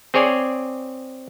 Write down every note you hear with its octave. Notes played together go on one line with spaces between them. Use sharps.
C4 G#4 C#5 D5 G#5